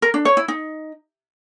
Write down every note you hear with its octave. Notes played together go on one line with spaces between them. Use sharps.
A#4
D4
C#5
E4
D#4